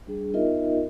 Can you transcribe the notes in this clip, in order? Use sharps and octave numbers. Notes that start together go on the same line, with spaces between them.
G3 D4 G#4
B3 D#4 F4 A#4 D#5 E5